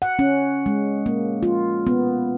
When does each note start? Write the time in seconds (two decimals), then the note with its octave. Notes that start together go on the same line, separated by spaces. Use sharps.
0.02 F#5
0.19 C#4
0.66 G#3
1.06 A#3
1.43 F4
1.87 B3